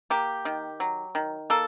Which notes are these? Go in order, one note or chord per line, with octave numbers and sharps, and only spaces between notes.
A#3 G4
D#3
F#3
D#3
A#3 A4